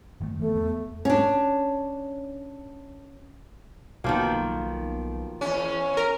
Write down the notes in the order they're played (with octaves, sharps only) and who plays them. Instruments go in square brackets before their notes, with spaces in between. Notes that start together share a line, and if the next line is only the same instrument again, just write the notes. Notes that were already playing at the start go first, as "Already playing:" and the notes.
[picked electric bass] F#1 D#3 A3
[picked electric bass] E3 F3 B3 [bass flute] A3
[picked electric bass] E2 B3
[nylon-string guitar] C#4 D4
[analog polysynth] B1 [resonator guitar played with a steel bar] D#3 F3 A#3
[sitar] E2 C#4
[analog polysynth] A#4